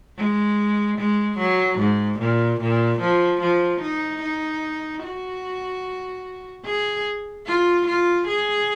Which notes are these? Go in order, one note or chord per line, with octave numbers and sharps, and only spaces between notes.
G#3
G#3
F#3
G#2
A#2
A#2
F3
F3
D#4
D#4
F#4
G#4
F4
F4
G#4